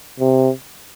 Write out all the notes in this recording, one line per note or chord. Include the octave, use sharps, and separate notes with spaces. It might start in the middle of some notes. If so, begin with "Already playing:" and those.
C3